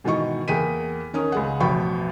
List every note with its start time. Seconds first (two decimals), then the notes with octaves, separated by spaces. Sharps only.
0.04 G#2 B2 D#3 E3 D#5 C#6
0.48 E2 A#3 G#4 G5 B6 D#7
1.13 D#3 C#4 A#4 D#6
1.32 C#2 G#3 F#5
1.60 A1 F2 B2 G5 B5 C#6